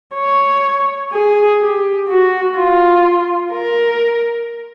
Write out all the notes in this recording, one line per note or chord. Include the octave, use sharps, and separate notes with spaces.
C#5
G#4
G4
F#4
F4
A#4